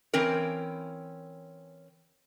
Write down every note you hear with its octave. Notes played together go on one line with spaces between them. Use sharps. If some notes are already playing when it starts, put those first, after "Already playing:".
E3 C4 C#4 A#4